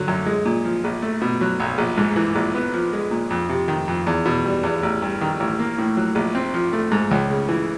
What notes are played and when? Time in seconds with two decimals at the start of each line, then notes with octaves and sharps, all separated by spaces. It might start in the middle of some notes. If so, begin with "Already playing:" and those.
Already playing: D3 F#3
0.08 F#2
0.26 G#3
0.45 A#2
0.65 F3
0.84 A#1
1.02 A3
1.21 B2
1.41 F#3
1.60 B1
1.78 A#1
1.98 G#2
2.16 E3
2.35 A#1
2.55 B3
2.74 F3
2.93 G#3
3.11 A#2
3.30 F2
3.49 C3
3.68 D#3
3.88 F2
4.07 E2
4.26 B2
4.45 G3
4.63 E2
4.83 A1
5.02 G2
5.21 D#3
5.40 A1
5.59 A#3
5.78 A2
5.97 F#3
6.15 A#1
6.35 C4
6.54 F3
6.73 A3
6.92 G#2
7.11 C#2
7.30 C#3
7.49 E3